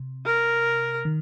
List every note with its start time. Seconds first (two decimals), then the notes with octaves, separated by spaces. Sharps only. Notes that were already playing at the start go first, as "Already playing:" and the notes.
Already playing: C3
0.26 A#4
1.05 D#3